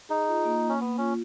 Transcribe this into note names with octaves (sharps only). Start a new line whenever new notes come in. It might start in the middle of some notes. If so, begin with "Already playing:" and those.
D#4 G#4
F4
A#3
A#3
C#4
A#3 B3
C#4 F4